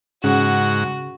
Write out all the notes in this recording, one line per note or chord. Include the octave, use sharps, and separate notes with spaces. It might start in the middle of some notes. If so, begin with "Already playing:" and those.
G#2 C#3 F#4 F#5